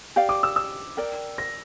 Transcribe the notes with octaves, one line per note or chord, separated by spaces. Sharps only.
G4 D5 F5
D6
E6
E6
A#4 D5 G5
A#6